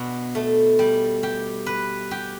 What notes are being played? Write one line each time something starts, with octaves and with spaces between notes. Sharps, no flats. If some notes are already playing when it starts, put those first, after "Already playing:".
Already playing: B2 D4
A3
G3
G4
B4
G4